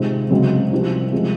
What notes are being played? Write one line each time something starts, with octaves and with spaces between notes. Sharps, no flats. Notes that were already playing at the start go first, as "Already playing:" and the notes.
Already playing: C3 D#3 G#3 C4 F4
C#2 C3 F#3 C4
C2 C3 F3 C4
C3 F3 G#3